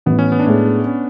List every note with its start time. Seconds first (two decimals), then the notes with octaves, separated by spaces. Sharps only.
0.06 A1 B3
0.19 C#4
0.32 B3
0.40 D4
0.46 A2 G#3 C#4
0.86 C#4